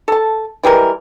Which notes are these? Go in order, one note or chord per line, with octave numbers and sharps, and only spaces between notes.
A4 A5
E3 G3 G#3 A#4